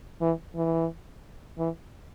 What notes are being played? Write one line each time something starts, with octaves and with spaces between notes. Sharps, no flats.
E3
E3
E3